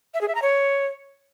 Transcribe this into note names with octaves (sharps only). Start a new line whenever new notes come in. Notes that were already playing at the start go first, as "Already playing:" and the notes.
E5
G#4
E5
A#5
C#5